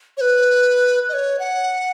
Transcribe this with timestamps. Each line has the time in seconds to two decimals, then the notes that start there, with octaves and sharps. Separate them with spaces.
0.17 C#5
0.21 B4
1.09 D#5
1.13 C#5
1.39 F#5